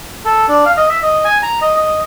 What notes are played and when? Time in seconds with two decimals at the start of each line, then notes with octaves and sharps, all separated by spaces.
0.25 A4
0.48 D4
0.65 F5
0.77 D#5
0.89 E5
1.02 D#5
1.25 G#5
1.43 A#5
1.61 D#5
1.77 D#5